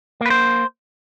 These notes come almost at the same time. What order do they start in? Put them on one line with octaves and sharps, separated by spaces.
A#3 B4 C5